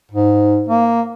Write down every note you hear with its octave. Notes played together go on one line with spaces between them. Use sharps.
G#2
A#3